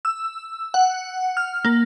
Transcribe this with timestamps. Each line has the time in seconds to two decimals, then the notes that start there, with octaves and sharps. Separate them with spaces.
0.05 E6
0.74 F#5
1.37 F6
1.65 A#3